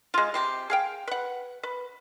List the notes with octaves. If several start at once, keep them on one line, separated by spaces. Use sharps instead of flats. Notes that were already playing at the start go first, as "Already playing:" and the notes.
G#3 F4
C3 G4 C6
G#4 F5 G5
B4 F#5
B4